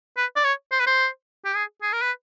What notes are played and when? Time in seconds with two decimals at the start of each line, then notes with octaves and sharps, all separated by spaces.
0.17 B4
0.36 D5
0.44 C#5
0.71 C5
0.80 B4
0.87 C5
1.45 G4
1.55 G#4
1.82 G#4
1.93 A#4
2.02 B4